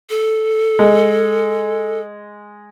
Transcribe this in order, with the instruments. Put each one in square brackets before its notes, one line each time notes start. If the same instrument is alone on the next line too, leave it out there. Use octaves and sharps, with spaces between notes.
[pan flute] A4
[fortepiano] G#3